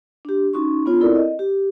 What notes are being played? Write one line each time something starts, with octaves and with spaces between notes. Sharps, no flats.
D4 G4
C#4 D#4 F#4 C6 C#6
B3 D4 F4 C#5
C4 E4 A4 A#4 D5
D#5
G4